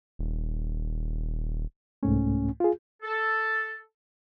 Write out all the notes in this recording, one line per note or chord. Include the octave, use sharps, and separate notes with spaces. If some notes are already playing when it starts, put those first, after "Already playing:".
D#1
C2 G#2 A3 C#4
F4 G#4
A4